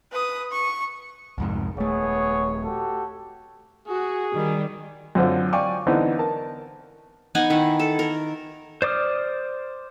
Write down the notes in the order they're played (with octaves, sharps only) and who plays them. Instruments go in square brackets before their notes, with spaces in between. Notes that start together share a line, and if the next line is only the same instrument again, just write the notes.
[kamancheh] B4 D#6
C#6
[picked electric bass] C2 F2 G#2
[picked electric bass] D#1 A3 [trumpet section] B3 G#4 C#5
[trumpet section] F#4 G4 A4
[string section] F#4 [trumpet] G#4
[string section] D#3 G3
[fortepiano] F#2 D3 C4 F4
D5 F5 G5 G#5 C#6 D6
D3 E3 B3 C4 D#4
A#4 A5
[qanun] B3 D#4 F#5 G#5
D#3 E4 F#5
A4
A#4
[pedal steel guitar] C5 D5 D6 D#6 F6